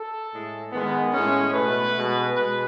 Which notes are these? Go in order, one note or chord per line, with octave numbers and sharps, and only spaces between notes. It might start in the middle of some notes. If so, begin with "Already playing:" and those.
Already playing: A4
A2 G#3
D#3 G#3 B3
A2 G#3 C#4
B2 A3 B4
B2 G#3
B2 G#3 B4